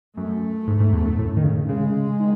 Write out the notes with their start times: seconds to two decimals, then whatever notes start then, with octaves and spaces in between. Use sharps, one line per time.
0.17 F#2 A3
0.67 G#2
0.80 G#2
0.93 E2
1.05 F#2
1.19 A2
1.37 D#3
1.44 C#3
1.69 C#3 G#3
2.20 D#3